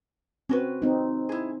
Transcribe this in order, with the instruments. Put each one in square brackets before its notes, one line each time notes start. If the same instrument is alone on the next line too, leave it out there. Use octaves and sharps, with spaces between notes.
[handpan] C4 [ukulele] C#4 F#4 B4
[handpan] C4 D#4
[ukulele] E4 G#4